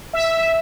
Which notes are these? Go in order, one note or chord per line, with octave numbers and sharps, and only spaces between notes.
E5